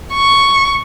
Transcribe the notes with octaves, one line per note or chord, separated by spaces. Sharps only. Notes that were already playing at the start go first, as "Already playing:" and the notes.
C#6